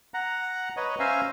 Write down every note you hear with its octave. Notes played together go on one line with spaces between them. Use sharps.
F#5 A#5
B4 C#5 D#5 A#5
C#4 C5 E5 F5 G#5 A#5